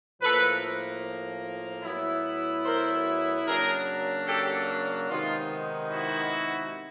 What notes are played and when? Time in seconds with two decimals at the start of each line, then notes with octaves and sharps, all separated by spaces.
0.22 A2 F3 A#3 A4 B4
1.84 A2 F#3 B3 E4
2.65 A#4 C5
3.46 C#3 F#3 A#3 D4 G#4 A#4
4.27 G4 A4
5.09 C3 D#3 G#3 B3 D#4 F4
5.90 E4 F#4